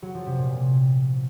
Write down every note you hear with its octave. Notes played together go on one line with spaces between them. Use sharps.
F#3
F3
C3
A#2
A#3